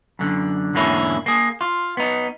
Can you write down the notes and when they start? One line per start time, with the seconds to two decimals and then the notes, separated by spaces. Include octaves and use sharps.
0.19 F#2 D3
0.74 E2 G#2 D3 A#3 C#4 E4
1.26 A#3 G#4
1.61 F4
1.97 B3 D#4